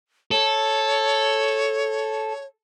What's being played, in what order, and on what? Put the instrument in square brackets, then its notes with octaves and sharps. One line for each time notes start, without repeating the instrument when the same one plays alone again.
[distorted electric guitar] A4 [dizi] C#5